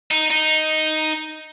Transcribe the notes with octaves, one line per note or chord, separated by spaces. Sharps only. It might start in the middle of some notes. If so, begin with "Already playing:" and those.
D#4
D#4